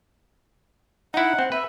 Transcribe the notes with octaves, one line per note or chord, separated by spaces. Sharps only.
D#4 E4 F#5
C4
B4 E5